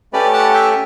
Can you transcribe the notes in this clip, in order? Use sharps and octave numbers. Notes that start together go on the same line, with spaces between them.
A3 C#4 G4 B4 D5
F#5 A5
E5 G5